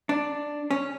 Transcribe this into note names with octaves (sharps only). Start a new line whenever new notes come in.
D4
C#4